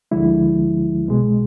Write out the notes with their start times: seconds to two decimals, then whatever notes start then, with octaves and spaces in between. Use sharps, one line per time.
0.11 D2 D3 F3 G#3 E4
1.06 C2 B2 G#3